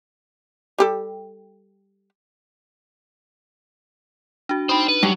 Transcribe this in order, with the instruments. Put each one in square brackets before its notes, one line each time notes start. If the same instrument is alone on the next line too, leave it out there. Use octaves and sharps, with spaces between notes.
[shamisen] G3 G4 A4
[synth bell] D4 F#4
[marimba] D#4 B5 [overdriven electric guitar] C5 G5
[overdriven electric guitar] B4
[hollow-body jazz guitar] G2 [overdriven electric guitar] F#3